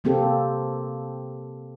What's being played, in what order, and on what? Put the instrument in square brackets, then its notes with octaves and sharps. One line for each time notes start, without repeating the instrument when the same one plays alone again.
[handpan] C3 A#3 C4 G4 A4